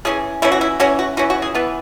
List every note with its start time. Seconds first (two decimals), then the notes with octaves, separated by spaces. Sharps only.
0.05 E3 C#4 G#4
0.42 E3 C#4 E4
0.52 F#4
0.61 E4
0.80 E3 C#4 F#4
0.99 F#4
1.17 E3 C#4 F#4
1.30 F#4
1.42 G#4
1.55 E3 B3 B4